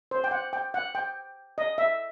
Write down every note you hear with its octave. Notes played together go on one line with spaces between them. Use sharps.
C5
G5
F#5
G5
F#5
G5
D#5
E5